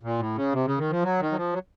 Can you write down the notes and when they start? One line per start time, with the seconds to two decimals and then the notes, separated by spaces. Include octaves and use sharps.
0.03 A#2
0.19 A2
0.36 C#3
0.53 C3
0.66 C#3
0.78 D#3
0.90 F3
1.03 F#3
1.20 D#3
1.32 F#3
1.37 F3
1.53 F#3